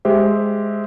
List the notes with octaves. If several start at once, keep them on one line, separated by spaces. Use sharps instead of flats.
G#3 G4 C5 E5